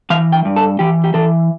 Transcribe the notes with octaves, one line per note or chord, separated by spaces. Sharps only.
E3 F5
G5
G2
A4
E3 G4
G4
E3 A4